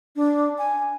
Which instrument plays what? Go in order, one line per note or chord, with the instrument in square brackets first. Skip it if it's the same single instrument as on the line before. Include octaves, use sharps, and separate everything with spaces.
[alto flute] D4
G#5